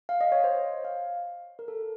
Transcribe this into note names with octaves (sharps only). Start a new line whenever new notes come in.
F5
D#5
C#5
C5
F5
A#4
A4